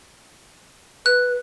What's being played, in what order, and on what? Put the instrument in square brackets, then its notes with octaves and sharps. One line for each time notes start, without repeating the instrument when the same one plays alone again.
[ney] B4 [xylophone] F#6